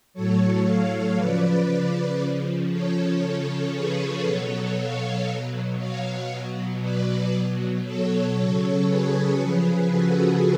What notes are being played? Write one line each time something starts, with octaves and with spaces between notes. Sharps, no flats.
A2 F#3 A4 C#5
C#5 F5
C#3 F3 B4 D5
C#3 F3
A4 C#5
C#3 F3 A4 C#5
G#4 B4
B2 F#3 A4 C#5
C#5 F5
B2 F#3
C#5 F5
B2 F#3
B4 D5
B2 F#3
A4 C#5
C#3 F#3 A4 C#5
G#4 B4
C#3 F3 G#4 B4
F#4 A4